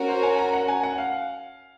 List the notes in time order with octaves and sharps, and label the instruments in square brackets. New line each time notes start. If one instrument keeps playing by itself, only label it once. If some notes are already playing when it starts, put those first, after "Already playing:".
Already playing: [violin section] C#4 F#4 A#4
[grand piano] C5
G#5
A#5
F#5
G#5
F#5
F5